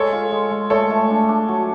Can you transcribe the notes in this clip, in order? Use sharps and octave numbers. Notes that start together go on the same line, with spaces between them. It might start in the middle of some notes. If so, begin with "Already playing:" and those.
Already playing: G#3 A4 C#5
F4
G#3
G#3
A3 A4 C#5
A3
D4
D4
F#3